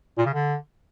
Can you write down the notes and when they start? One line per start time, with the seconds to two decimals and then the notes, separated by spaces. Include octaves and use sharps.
0.18 A#2
0.26 C#3
0.34 D3